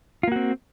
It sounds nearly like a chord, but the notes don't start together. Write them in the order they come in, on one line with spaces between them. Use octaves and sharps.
F4 A#3 F#4 C4